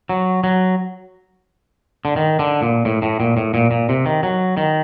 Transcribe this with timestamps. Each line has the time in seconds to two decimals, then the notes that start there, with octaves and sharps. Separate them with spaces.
0.09 F#3
0.44 F#3
2.05 D3
2.16 D#3
2.39 D3
2.62 A#2
2.85 A2
3.02 A2
3.20 A#2
3.37 A2
3.54 A#2
3.71 A#2
3.89 C3
4.06 D#3
4.23 F#3
4.57 D#3